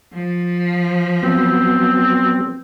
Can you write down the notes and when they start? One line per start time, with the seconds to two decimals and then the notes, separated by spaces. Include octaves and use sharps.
0.14 F3
1.23 F#3 B3 C4